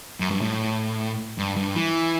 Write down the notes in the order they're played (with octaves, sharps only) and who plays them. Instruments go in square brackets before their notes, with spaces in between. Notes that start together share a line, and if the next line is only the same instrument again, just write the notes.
[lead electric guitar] F#2
G2
A2
G2
G2
E3